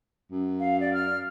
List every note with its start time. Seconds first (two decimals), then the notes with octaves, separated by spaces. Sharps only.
0.32 F#2
0.60 F5
0.81 D5
0.93 F6